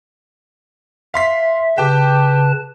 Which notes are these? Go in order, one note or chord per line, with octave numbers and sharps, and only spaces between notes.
E5 F5 C6 B6
C#3 G4 B4 G5 A5